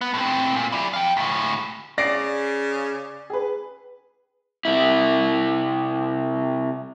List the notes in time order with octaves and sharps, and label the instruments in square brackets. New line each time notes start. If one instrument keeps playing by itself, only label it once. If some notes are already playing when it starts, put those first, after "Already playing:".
[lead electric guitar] B3
A2 C4
A#2
E4 D5
F5 G5
D2 A2
[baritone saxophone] C#3 [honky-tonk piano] D5 [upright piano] A#6 C7 D7
[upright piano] G#4 B4
[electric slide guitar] C3 E4